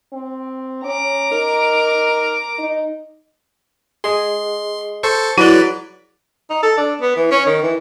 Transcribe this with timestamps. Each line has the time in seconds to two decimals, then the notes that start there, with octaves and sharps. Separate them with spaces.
0.13 C4
0.85 C#4 A#5 D6
1.32 D#4 A#4
2.59 D#4
4.04 G#4 D#5 C6
5.03 A4 C5 C#6
5.38 F#3 E4 F#4 G#4 B4 D5
6.50 D#4
6.63 A4
6.77 D4
7.02 B3
7.16 E3
7.31 C#4
7.46 D#3
7.63 E3